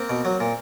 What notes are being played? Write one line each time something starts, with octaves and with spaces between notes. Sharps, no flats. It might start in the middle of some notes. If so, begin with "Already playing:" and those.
Already playing: A#3 C4
B2
F#3
A#2